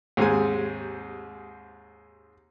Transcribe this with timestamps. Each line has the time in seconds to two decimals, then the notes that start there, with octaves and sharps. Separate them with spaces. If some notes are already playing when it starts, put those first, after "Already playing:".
0.17 D#2 G#2 C3 G#3 G#5